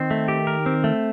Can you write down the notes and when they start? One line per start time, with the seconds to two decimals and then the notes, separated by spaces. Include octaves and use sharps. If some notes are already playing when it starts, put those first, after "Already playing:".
Already playing: D#3 C4
0.11 A3
0.28 G4
0.47 A#4
0.66 C4
0.84 A3